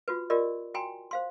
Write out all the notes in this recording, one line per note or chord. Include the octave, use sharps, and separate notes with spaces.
F4 F#4 B4
F4 G4 A#4 D5 D#5
F#4 G5 G#5 A#5 C6
C5 F5 C6